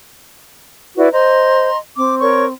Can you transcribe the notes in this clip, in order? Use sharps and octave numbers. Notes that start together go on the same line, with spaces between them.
E4 F#4 B4 D5
C5 D#5 A#5 C6
C4 D6
A#4 C#5 C#6